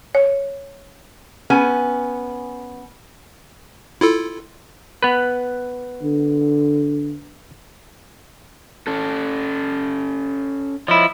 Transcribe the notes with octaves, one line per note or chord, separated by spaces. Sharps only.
C#5
B3 C#4 G#5
E4 F4 A4
B3 B4
D3
C#4 A4
F3 E4 C#5 D#5